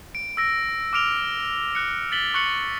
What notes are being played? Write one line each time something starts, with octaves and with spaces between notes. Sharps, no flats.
D7
E6 A#6 D7
D6 F6 D7 F7 G7
F#6 C#7
A6 B6 F#7 G7
C#6 F#6 C#7 F#7